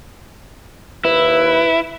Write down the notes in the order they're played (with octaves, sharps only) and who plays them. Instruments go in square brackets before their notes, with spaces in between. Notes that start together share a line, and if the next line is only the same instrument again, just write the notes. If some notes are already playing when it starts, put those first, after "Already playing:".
[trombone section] D#2 B4 [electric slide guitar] E4